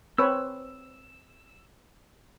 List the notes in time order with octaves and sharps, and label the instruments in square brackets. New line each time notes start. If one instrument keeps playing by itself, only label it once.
[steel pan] C4 B4 C#5 [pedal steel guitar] E6